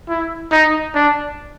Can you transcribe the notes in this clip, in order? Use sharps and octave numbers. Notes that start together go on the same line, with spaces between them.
E4
D#4
D4